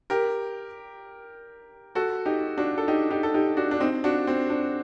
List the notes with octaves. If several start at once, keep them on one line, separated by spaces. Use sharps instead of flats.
G4 A#4
F#4 A4
D#4 G4
D4 F#4
A4
D#4 G4
D#4 G4
A4
D#4 G4
D4 F#4
D4
C4 D#4
D4 F#4
C4
D4